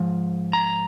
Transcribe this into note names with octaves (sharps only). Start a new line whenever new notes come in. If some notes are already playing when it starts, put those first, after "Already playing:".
Already playing: G#2 F3
A#5